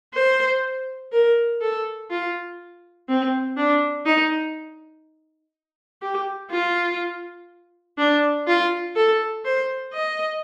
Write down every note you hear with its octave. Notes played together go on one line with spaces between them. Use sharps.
C5
A#4
A4
F4
C4
D4
D#4
G4
F4
D4
F4
A4
C5
D#5